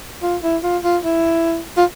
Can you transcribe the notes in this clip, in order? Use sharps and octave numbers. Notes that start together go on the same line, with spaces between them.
F4
E4
F4
F4
E4
F4